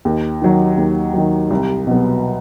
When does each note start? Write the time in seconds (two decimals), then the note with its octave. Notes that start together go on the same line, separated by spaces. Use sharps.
0.05 D#2
0.42 D#3 F#3
0.78 D#2
1.14 D#3 F#3
1.50 C2
1.87 B2 F#3 B3